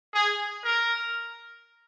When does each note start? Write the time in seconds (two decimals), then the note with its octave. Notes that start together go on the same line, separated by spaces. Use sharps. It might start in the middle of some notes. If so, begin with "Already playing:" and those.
0.13 G#4
0.63 A#4